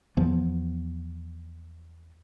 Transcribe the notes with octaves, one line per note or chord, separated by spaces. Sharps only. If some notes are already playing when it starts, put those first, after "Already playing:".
E2 E3 F3 B3